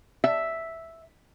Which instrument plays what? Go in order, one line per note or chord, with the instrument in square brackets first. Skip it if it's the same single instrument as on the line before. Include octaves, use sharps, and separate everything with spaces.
[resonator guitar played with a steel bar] E5